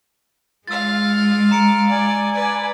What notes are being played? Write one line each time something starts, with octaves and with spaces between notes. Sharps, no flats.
G#3 F4 F5 E6 A6
A#5 C#7 D7
D5 G#5
B4 D5